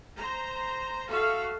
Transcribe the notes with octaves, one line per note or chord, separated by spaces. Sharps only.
C5 A#5
F#4 A4 E5 F5